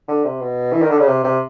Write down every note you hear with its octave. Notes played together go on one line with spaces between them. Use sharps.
D3
C3
B2
E3
D#3
D3
C#3
C3
C3